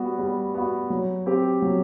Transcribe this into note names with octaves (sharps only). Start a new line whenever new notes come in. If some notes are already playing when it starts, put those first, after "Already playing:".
Already playing: G3 B3 F#4
G3
B3 F#4
F#3
C4 G4
F#3